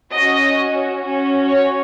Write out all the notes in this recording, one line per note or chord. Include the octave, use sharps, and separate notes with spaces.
C#4 F#4 D#5
C#4 F#4
C#5